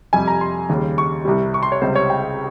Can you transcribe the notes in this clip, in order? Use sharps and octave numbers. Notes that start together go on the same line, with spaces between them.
F2 C3 G3 G#5
A#5
C6
D#2 C#3 G3
C#6
C2 C3 G3
C#6
C6
C#5
C#2 C3 G3 C5
C#5
G5